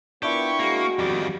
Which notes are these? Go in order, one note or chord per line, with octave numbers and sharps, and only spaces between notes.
B3 D4 E4 F4 G4 A#4 C#6
G#3 A#3 F#4
F2 D#3 G3 D6